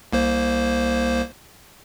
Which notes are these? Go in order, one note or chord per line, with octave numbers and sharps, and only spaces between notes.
C2 A#3 C5